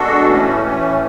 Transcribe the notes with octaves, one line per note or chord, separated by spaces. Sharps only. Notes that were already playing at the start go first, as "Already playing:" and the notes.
Already playing: B2 G#3 D4 F#4 A4
A2 E3 A3 C#4
A2 E3 A3 C#4